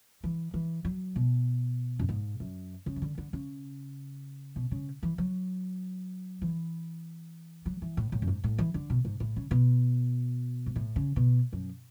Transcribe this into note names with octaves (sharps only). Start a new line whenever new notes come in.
E3
E3
F#3
B2
F#2
G#2
F#2
C#3
E3
D3
D3
C#3
B2
C#3
E3
F#3
E3
F#3
E3
A2
A2
F#2
G#2
A2
E3
D3
B2
G#2
A2
C#3
B2
G#2
A2
C#3
B2
F#2